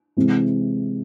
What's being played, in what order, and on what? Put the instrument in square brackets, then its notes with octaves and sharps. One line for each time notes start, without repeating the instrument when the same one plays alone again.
[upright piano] C3 E3 G#3